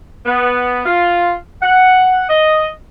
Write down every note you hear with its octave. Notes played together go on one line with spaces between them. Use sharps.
B3
F4
F#5
D#5